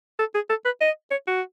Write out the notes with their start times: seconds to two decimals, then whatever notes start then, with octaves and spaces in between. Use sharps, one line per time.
0.19 A4
0.35 G#4
0.50 A4
0.65 B4
0.81 D#5
1.11 C#5
1.28 F#4